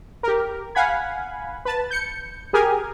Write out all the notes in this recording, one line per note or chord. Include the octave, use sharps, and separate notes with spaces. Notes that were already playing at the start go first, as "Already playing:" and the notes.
G4 A#4
F5 F#5 G#5 B5 G#6
B4 A5
G6 C#7
G4 G#4 A#4 G#5